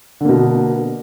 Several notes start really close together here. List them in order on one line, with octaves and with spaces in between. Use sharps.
D3 A#3 B2